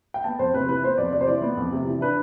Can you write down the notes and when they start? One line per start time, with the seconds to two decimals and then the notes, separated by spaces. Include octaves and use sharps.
0.14 G5
0.24 B3 A5
0.39 F2 C5
0.54 C3 B4
0.68 E3 B4
0.83 B3 C5
0.98 F2 D5
1.13 C3 D5
1.21 C5
1.27 E3 D5
1.42 B3
1.57 F2
1.73 C3
1.87 E3
2.01 D4 B4